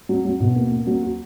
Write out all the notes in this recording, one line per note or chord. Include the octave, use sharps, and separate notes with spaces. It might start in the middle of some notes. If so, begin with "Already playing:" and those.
F#3
F#3
B2
A#3
A#3
F#3
F#4